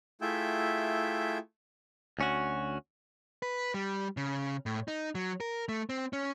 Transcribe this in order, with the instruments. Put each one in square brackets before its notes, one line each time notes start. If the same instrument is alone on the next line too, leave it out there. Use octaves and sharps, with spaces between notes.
[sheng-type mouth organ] A3 E4 F4 G#4 E5 G5
[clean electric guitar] D2 C#4 F#4
[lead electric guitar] B4
G3
C#3
A2
D#4
F#3
A#4
A3
C4
C#4